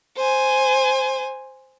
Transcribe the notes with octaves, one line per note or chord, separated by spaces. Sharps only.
C5 G#5